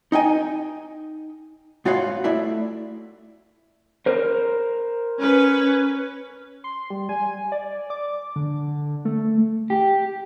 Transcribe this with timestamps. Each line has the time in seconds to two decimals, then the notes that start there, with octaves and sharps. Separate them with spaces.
0.12 D#4 D#5 G5 G#5
1.85 G#2 F4 F#4 C#5 F5 B5
2.24 A3 E4 D5 E5
4.06 A#4 C5
5.19 C#4 B4
6.64 C6
6.90 G3
7.09 G#5
7.52 D5
7.90 D6
8.36 D3
9.05 A3
9.70 G4